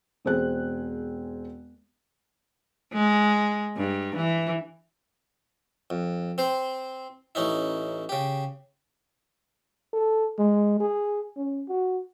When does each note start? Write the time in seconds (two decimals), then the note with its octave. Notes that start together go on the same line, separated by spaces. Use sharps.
0.25 E1 C4 G#4 F#6
2.93 G#3
3.77 G2
4.16 E3
5.90 F2
6.38 C4 C5
7.35 A1 C#4 D#4 E4
8.09 C#3 G4
9.93 A4
10.38 G#3
10.80 G#4
11.37 C#4
11.69 F#4